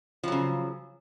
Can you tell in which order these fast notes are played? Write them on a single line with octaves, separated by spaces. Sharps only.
F3 F#3 C#3